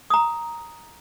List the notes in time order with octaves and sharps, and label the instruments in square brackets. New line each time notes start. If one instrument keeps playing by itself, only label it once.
[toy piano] A#5 D#6